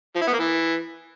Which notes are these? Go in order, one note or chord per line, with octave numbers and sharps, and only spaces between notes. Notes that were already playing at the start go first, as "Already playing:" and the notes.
F3
E4
B3
A#3
E3